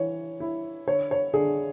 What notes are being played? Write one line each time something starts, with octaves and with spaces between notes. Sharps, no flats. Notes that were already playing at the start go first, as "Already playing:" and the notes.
Already playing: E3 C#5
E4
D3 C#5
C#5
D3 G#4